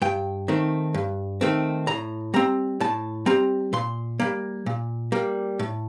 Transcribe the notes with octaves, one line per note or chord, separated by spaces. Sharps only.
G2 G5
D#3 A3 C4
G2
D#3 A3 C4
A2 A#5
G3 C4 A#5
A2 A5
G3 C4 A#5
A#2 C6
G3 A#3
A#2
G3 A#3
A2